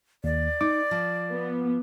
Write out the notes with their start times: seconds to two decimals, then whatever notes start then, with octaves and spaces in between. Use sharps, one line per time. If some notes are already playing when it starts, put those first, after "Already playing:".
0.24 D#2 D5
0.61 D#4 D6
0.91 F3
1.31 B3